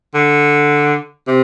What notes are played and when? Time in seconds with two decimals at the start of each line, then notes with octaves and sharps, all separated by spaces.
0.14 D3
1.28 C3